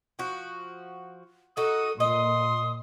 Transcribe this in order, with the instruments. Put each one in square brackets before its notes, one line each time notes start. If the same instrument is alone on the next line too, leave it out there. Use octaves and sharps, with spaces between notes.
[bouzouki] F3 F#4
[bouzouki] D#4 F#4 [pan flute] A4 [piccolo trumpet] D#6
[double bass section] A#2 [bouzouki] D#5 [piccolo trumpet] C6 [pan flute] D#6